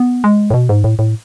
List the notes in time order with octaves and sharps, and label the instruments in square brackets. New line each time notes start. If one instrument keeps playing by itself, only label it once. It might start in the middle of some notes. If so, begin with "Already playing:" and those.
Already playing: [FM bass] B3
G#3
A2
B2
G#2
A2
A2